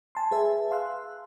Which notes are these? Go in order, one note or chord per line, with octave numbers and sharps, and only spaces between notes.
G#5 A5 C6
G#4 B4 E5 G#5
F5 C6 E6 F#6